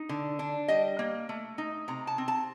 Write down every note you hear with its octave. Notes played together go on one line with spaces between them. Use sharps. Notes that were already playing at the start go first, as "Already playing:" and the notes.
Already playing: D#4
D3
D4
G3 D#5
A#3
A3
D#4
C3 A#5
A5
C4
A5